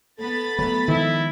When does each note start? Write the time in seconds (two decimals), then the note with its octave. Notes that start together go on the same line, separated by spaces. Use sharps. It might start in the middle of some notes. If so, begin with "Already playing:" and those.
0.19 B3 A4 B5 A6
0.59 F#3 A3
0.88 D#3 F3 G#3 E4